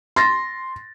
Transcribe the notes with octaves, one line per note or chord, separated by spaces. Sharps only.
C6 A6 A#6